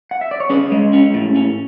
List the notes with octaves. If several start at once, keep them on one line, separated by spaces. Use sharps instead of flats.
F#5
E5
D5
C#5
C#4 G#4 B4
G#3
C#4
A2
C#4